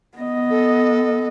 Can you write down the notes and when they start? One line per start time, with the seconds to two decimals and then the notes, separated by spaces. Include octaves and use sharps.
0.18 B3 D#5
0.50 A4